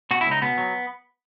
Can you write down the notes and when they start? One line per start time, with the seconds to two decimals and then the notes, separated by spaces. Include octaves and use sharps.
0.11 B2 F#4
0.21 E4
0.26 C#2
0.31 D#4
0.42 B2 B3
0.58 F#3